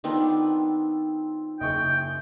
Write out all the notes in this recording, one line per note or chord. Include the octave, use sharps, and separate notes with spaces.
D#3 B3 C4 D4 F4 A4
F#1 G#4 D#5 G5 C#6